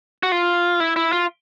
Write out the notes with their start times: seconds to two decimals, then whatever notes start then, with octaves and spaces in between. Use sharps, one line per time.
0.23 F#4
0.32 F4
0.80 E4
0.96 E4
1.12 F4